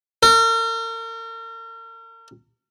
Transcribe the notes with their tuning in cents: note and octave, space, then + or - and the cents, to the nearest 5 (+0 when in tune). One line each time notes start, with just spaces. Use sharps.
A#4 -40